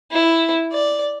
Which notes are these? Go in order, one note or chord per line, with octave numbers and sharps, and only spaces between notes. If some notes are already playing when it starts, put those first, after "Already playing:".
E4
D5